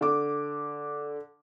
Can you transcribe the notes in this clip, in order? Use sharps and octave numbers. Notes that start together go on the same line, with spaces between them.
D3 D6